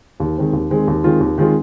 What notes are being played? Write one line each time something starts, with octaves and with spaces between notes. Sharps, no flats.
D#2
D#3 G#3 C4
D#2
D#3 G#3 C4
D#2
D#3 G#3 C4 F4
D#2
D#3 G#3 C4 F4